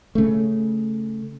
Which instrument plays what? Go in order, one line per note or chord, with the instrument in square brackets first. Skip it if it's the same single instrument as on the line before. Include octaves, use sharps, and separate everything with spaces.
[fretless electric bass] C#3 A3